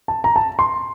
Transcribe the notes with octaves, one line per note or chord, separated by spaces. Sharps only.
A5
A#5
A5
C6